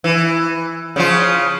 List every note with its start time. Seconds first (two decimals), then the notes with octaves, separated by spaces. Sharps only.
0.04 E3
0.96 C#3 F3 F4